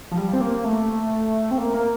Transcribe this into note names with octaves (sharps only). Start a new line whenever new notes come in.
F3
G3
C4
A#3
A3
C4
A#3
A#3